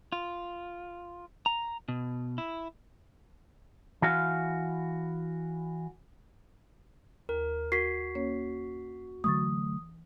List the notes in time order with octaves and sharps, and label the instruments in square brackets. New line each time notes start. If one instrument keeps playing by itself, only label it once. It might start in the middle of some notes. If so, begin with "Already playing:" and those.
[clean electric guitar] F4
A#5
B2
E4
E3 F#4 F5
[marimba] D#2 [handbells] A#4
[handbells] F#4 [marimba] A#4 [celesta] B6 C7
[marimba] A#3 C#4 C#5
[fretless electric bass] D3 F#3 A3 [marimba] E3 C#6 A6 [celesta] D#6